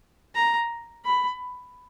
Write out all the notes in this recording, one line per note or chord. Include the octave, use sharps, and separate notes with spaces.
A#5
B5